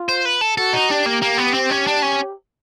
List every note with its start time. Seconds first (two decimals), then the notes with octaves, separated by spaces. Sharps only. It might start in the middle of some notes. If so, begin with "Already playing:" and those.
Already playing: F4
0.09 C5
0.25 B4
0.41 A4
0.57 F#4 A4
0.73 D#4
0.89 D4 G4
1.06 A#3
1.22 A#3
1.37 B3
1.54 C4
1.70 C#4
1.87 D4
2.02 C#4